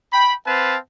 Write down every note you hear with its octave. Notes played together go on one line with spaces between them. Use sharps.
G5 B5
C4 B4 F5 A5